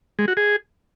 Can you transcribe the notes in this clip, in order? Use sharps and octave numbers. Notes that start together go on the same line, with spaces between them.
G#3
F#4
G#4